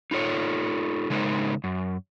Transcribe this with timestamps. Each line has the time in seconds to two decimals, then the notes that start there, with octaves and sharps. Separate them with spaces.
0.11 D#4 F4 A4 C#5
1.10 C#3 G#3 D#4 A#4 C5
1.64 F#2